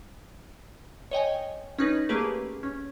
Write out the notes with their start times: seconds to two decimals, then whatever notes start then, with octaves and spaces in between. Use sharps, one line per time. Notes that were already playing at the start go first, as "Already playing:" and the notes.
1.11 C#5 D#5 G5 G#5
1.79 C#4 D#4 B4
2.09 A3 A#3 C#4 G4 G#4 B4
2.63 C#4